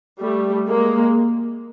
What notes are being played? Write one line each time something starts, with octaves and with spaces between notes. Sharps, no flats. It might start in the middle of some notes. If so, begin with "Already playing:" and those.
G3 A3
G#3 A#3